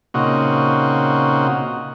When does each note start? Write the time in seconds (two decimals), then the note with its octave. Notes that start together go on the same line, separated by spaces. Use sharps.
0.14 A#2 C#3 C4 D#4 F#4